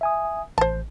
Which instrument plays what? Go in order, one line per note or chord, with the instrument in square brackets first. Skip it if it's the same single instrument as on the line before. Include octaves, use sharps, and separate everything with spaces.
[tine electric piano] E5 G#5 D#6
[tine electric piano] A1 [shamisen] C5 A5